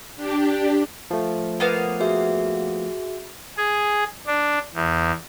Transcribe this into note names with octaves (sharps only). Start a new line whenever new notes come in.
D4 G4
F3 A3
A#3 B3 F5
F#4 G#4 E5
G#4
D4
E2